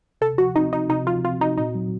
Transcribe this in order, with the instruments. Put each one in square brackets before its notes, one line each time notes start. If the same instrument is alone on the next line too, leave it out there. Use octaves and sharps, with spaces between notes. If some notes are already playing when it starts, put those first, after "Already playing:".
[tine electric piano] C3 [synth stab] A4
[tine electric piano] F3 [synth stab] F#4
[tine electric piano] C4 [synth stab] D#4
[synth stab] D#4 [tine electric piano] F#4
[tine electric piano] C3 [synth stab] D#4
[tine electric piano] F3 [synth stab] F4
[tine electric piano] C4 [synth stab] F4
[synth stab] D#4 [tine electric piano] F#4
[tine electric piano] A#2 [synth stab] D#4
[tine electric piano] F#3